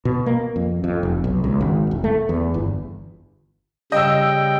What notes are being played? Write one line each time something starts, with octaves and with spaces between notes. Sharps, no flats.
B2
A#3
F2
F2
F1
B1
C#2
G#1
E1
A3
E2
G1
C#3 G3 D#5 G5 E6